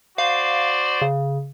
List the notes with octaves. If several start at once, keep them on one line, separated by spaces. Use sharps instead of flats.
F#4 C5 D5 F5
C#3